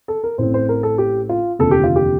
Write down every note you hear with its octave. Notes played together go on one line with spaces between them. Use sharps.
A4
A#4
A1 A2 A3 C4 C5
C5
A#4
A4
G4
F4
F1 D#2 D3 F3 A4
G4
F4
G4